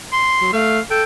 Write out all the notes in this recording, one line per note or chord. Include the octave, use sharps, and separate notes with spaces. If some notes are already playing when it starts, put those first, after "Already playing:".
C6
F#3
A3 F5
A4 G5